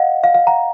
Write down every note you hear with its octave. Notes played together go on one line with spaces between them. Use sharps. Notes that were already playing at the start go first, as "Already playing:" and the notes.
Already playing: D#5 F5 F#5
F5
F5
F#5 A#5